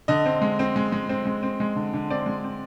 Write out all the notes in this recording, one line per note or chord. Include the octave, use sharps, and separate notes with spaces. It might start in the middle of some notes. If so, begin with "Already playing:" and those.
D3 D#5
C4
G#3
C4
G#3
G#3
C4
G#3
C4
G#3
D3
D3
C4 D5
G#3
C4